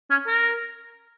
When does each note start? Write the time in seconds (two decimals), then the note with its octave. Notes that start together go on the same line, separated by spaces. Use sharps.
0.10 C#4
0.27 A#4